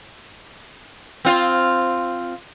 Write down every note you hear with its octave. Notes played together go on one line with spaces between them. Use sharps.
C4 F4